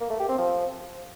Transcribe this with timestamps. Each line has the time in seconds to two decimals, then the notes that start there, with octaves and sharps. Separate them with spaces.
0.01 A#3
0.10 A3
0.20 G4
0.29 C4
0.38 F3